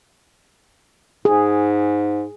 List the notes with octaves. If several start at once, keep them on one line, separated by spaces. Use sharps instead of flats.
G#2 G#4